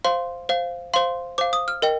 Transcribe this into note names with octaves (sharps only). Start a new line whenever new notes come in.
C5 F5 C6
C5 F5
C5 F5 C6
C5 F5 D6
D#6
F6
A#4 D#5 G5